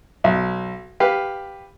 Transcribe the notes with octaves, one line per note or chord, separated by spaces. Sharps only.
B1
G4 B4 F5